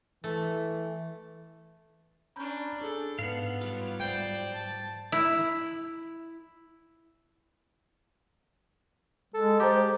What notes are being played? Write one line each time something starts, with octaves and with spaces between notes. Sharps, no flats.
E3 A3
C#4 D4 A#5 B5 G6
D4 G#4 A4
G#2 B3 F5 F#5
F#3 G3 F4
C5 D5 G5
A5
E4
G#3 A4
G4 C5 A#5 D6